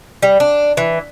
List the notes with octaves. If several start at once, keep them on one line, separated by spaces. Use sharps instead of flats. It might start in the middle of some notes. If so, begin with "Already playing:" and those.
G3
D4
E3